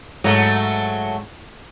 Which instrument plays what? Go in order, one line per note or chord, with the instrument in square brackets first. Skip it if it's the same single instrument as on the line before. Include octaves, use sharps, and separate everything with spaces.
[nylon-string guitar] G#2 [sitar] F#3 A3